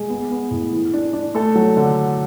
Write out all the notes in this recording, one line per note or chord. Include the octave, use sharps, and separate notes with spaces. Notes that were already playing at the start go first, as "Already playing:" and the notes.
Already playing: G#3 G#4
B3
B3
A2
E3
D4
D4
A3 A4
F#3
D3